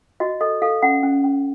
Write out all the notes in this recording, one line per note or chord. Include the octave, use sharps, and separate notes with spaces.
F#4 D#5
A4 D#5
A4 F5
C#4 F#5
C#4
C#4